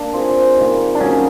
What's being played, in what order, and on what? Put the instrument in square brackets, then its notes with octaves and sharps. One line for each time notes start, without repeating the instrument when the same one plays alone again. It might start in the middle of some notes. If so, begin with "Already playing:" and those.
Already playing: [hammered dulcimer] A#3 [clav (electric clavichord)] D4
[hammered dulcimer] C4 F4 G#4
D#3 G3 A#3
[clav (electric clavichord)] D4
[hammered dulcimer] F#3 A#3 D#4 G#4 [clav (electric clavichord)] C#4